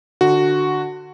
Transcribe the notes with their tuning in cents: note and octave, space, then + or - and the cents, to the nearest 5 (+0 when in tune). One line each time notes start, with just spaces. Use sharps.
D3 +20 F#4 +0